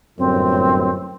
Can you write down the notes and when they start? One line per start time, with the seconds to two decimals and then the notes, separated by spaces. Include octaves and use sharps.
0.18 G1 F#2 A2 C4